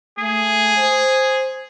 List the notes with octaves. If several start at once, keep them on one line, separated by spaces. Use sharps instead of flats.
A3 G#4
C5